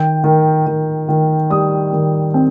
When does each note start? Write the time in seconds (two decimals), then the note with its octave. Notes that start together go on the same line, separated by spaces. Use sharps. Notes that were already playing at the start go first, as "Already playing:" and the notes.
Already playing: D#3 G5
0.24 D#3
0.66 D#3
1.09 D#3
1.50 G3 D#6
1.93 D#3
2.34 C4